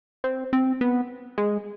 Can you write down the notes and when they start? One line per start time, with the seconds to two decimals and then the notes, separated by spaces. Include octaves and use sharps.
0.24 C4
0.53 C4
0.81 B3
1.38 G#3